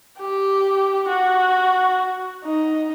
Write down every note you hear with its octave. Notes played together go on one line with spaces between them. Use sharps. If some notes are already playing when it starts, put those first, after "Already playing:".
G4
F#4
D#4